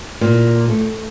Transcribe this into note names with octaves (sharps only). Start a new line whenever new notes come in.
A#2
A3